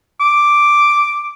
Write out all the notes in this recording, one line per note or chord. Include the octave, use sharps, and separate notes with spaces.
D6